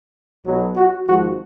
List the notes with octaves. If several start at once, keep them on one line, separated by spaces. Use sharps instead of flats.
B1 B2 F#3
F#4
G#1 G#2 F3 F#4